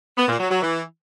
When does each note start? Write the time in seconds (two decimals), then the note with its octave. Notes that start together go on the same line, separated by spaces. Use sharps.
0.17 B3
0.28 A#2
0.39 F#3
0.50 F#3
0.61 E3